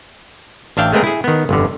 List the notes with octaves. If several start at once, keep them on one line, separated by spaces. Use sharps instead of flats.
A1 D4 E5 F5 G5
G#3 A3 B3 C4 G#4 A#4
E4 G#4
D#3 B3
G1 F2 D3